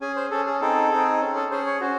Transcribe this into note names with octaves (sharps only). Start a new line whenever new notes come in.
C#4 G#4 G#5
C5
C#4 G#4 A4
G#4
C4 D#4 G#4 A4
C4 D#4 G#4
C#4 G#4 A4
A4
C#4 G#4 C5
C#5
C#4 F#4 C5